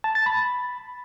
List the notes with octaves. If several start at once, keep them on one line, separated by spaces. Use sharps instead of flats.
A5
A6
B5